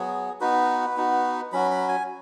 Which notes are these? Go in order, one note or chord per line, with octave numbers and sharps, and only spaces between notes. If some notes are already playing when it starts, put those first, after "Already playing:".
Already playing: F#3 B3 F#4 G#4
B3 D#4 F#4 B4
B3 D#4 F#4
F#3 C#4 F#4 B5
B5
G#5